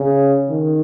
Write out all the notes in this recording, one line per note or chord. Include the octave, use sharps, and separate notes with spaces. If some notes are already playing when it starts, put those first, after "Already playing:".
Already playing: C#3
D#3